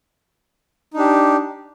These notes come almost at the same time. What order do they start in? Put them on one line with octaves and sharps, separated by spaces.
D#4 D4 G4